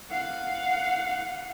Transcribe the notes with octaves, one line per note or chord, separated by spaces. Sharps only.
F5 F#5